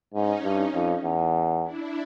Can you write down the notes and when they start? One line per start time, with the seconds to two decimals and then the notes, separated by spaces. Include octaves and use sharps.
0.14 G#2 C#4 D#4
0.44 G2
0.73 F2
1.04 E2
1.63 D4 E4